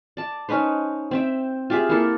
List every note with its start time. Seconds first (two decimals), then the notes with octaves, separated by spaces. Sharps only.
0.17 D5 A5
0.49 C#4 D#4 B4 C5
1.11 C4 E5 G5
1.70 F4 G4 G#4 E5
1.89 A#3 E4 A4